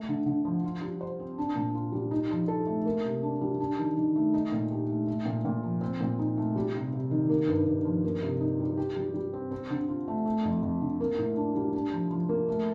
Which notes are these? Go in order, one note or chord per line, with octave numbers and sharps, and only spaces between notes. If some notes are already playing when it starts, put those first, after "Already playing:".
Already playing: A3
D3
D3
F3
F4
G3
C5
C4
D4
A#2
F4
G3
D#4
F3
A4
A3
A#3
C3
D4
G3
D4
D#3
D#3
A3
D#4
A#2
G4
A3
A3
A#2
A#2
F3
C4
A#2
D#4
A3
G3
C3
C3
D#3
A#3
G2
G2
F3
A#3
C3
D#4
G3
G4
G3
G3
C4
C4
D3
F4
A3
A3
F2
F2
D3
A#3
A2
D4
G3
D4
F3
F3
A#3
A3